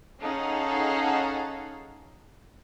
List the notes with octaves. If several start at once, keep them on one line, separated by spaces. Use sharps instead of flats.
C#4 D#4 G#4 A4 F5 F#5